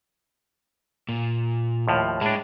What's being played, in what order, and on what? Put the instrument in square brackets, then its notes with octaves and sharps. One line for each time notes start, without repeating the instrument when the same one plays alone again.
[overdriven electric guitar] A#2
[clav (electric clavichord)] D#2 A2 F3
[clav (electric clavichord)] A2 D4 [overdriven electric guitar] G#3